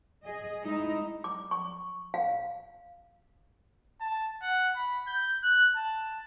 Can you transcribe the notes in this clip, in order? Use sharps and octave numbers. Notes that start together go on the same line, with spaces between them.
G#4 D#5
G#3 D#4 E4
D6
C#6
F5
A5
F#5
B5
G6
F#6
A5